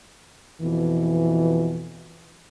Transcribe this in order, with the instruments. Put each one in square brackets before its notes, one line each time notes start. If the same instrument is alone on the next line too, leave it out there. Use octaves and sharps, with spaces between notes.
[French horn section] F2 B2 E3